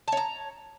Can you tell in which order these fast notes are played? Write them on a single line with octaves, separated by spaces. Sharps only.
A5 C#5 A#5